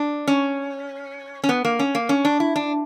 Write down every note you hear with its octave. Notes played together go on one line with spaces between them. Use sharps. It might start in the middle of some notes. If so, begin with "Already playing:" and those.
Already playing: D4
C#4
C#4
B3
A#3
C#4
A#3
C#4
D4
E4
D4